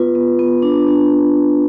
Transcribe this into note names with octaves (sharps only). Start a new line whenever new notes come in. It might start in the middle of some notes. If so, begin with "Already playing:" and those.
Already playing: B3 F4 B4
B3
B3
D4
D4